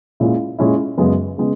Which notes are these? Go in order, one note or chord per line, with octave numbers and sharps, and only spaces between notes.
A#2 G#3 C#4 E4
A#2 G#3 C#4 E4
F#2 C#3 G#3 B3
C#3 G#3 B3